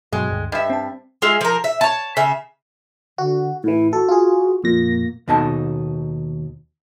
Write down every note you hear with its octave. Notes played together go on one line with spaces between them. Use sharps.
G2 B2 F#3 G#3
D2 G2
G2 D#5 E5
C4 A5
G#3 F4 G#4 E5
F3 A#4
E5
C#5 A5
C#3 E5
D3 F#4
A2 E3 E4
F#4 A4
F4 G#4
F2 A#2 A#3 A#6
D#2 B2 D#4 A4 A5